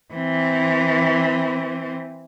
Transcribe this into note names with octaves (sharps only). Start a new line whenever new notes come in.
E3 C4